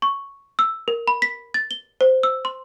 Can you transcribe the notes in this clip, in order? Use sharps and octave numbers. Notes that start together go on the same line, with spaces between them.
C#6
E6
A#4
B5
B6
A6
G7
C5
E6
C6